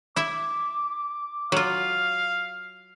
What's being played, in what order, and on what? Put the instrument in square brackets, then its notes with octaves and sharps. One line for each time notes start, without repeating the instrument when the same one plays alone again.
[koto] E4 E5 [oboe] D6
[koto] F#3 F4 [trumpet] F5